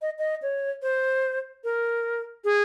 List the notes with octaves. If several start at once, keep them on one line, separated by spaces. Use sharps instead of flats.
D#5
D#5
C#5
C5
A#4
G#4